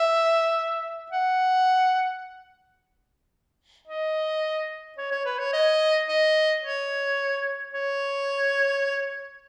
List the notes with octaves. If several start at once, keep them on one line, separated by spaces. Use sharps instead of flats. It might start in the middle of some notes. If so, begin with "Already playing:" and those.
Already playing: E5
F#5
D#5
C#5
C#5
B4
C#5
D#5
D#5
C#5
C#5